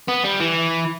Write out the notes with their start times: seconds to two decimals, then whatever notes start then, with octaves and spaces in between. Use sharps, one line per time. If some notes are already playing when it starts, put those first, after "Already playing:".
0.08 B3
0.24 G3
0.40 E3